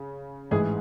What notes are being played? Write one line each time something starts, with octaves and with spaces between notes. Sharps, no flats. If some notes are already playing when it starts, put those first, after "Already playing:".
Already playing: C#3
A1 G#2 E3 G#4